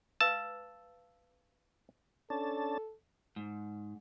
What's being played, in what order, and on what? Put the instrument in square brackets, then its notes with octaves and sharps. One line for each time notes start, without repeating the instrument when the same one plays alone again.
[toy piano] B4 F5 E6 [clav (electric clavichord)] A5
[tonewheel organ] C#4 D4 A5 [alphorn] A4
[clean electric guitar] G#2